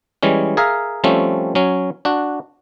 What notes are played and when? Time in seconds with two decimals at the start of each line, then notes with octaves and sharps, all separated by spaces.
0.23 E3 G3 G#3 C#4
0.57 G#4 A#4 E5 F5
1.04 F3 G3 A3 C4 C#4
1.55 F#3 C#4
2.05 D4 F#4